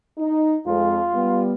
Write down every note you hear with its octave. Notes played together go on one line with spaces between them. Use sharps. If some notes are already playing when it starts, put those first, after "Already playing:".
D#4
F2 G#3 F4
G3 B3